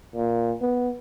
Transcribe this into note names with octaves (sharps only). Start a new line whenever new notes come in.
A#2
B3